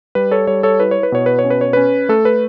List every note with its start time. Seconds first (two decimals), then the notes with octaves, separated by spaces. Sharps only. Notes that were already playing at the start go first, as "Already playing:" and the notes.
0.15 G3 B4
0.31 A4 C#5
0.47 G3 A4 C#5
0.63 A4 C#5
0.80 E4 B4
0.91 C#5
1.03 B4
1.12 B2 C#5
1.26 B4
1.39 C#5
1.45 C#4
1.50 B4
1.61 C#5
1.73 C#4 B4
2.09 A3 A4
2.25 B4